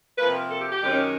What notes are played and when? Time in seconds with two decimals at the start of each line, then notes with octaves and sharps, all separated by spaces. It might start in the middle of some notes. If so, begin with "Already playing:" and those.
0.18 C3 F3 A#3 B4
0.34 A#4
0.50 A4
0.61 G4
0.71 G4
0.81 F#2 D#3 G#3 C#4